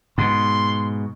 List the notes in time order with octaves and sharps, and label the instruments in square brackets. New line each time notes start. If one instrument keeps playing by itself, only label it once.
[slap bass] G#2 B2 [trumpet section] C6